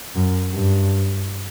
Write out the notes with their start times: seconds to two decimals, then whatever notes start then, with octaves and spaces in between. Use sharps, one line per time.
0.15 F#2
0.53 G2